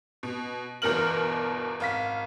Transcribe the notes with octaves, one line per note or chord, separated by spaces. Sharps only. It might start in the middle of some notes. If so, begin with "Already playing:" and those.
B2
G1 E2 B2 A#4 F6 F#7
G#1 F5 B6